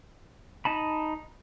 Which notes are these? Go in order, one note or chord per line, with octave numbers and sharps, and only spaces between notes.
D#4 A5 B5